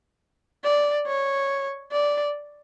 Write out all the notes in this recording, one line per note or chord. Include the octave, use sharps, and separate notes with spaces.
D5
C#5
D5